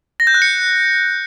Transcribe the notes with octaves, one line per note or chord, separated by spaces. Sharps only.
A#6
G6
F#6
C#7